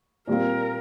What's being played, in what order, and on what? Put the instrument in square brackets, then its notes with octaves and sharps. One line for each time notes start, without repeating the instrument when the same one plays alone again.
[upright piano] A#2 G3 C4 F4 [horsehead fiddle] A#4